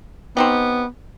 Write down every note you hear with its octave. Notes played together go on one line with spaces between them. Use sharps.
B3 C4 D#4 G4